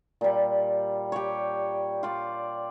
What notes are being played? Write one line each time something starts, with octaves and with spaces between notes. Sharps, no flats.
A#2 G3
G4 C#5
F4 D5